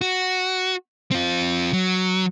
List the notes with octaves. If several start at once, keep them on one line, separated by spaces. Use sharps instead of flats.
F#4
C4 F4
F#3